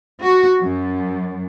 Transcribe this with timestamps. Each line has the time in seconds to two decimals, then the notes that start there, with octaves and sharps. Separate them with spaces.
0.22 F#4
0.62 F#2